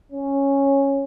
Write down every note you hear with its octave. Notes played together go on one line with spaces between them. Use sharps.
C#4